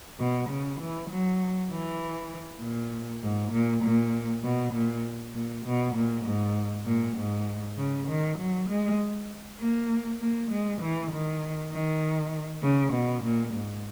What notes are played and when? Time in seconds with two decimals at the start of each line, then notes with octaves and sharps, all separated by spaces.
0.19 B2
0.50 C#3
0.80 E3
1.10 F#3
1.71 E3
2.62 A#2
3.23 G#2
3.52 A#2
3.84 A#2
4.44 B2
4.73 A#2
5.34 A#2
5.65 B2
5.96 A#2
6.25 G#2
6.86 A#2
7.17 G#2
7.78 C#3
8.08 D#3
8.38 F#3
8.69 G#3
9.60 A#3
10.20 A#3
10.51 G#3
10.81 E3
11.11 D#3
11.72 D#3
12.63 C#3
12.93 B2
13.23 A#2
13.54 G#2